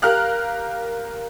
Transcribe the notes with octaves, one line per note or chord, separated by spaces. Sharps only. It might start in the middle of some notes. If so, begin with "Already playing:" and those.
G4 A#4 F5 F6 F#6